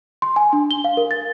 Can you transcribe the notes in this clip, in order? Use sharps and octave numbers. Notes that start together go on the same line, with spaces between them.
C6
G#5
D4
G7
F5
A#4
A6